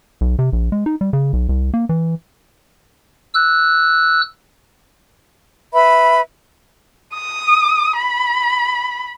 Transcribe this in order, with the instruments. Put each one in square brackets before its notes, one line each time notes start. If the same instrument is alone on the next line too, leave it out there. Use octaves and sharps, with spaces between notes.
[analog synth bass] B1
C3
A#1
G#3
D#4
G3
C#3
B1
C2
A#3
E3
[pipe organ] E6 F#6
[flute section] B4 E5 B5
[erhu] D#6
B5